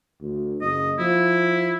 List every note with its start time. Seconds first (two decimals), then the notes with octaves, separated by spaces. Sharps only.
0.21 D2
0.61 F#1 D#5
0.99 F3 E4